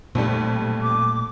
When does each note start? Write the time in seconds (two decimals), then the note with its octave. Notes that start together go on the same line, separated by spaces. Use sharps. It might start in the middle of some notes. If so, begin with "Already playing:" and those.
0.15 B1 F2 A#2 G3 A3
0.82 D6